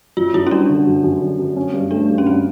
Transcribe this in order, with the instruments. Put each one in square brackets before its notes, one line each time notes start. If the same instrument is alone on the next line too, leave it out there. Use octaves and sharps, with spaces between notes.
[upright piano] F#2 [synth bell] F4
[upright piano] F#2 [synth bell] E4
[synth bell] C#4
[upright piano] G3 [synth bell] D4
[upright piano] D3
F#2
F#2
D3
F#2
C#4
G2
[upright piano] A3 [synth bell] D4
[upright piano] G2
[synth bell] C#4
[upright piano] G2 [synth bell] C4